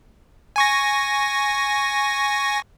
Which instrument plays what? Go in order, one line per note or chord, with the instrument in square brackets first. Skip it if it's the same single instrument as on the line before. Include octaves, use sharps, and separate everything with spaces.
[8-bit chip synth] G#5 C#6 A#6